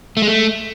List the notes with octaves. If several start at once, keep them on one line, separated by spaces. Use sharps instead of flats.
A3
G#3
A3